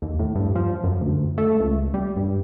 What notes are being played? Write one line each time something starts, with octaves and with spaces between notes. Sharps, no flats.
D#2
A2
G2
F3
F#2
D2
A3
C#2
G3
G2